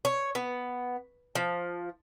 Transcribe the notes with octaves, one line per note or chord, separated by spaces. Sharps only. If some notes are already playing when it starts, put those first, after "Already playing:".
C#5
B3
F3